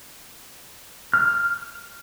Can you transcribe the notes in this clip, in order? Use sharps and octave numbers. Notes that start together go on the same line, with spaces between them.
F6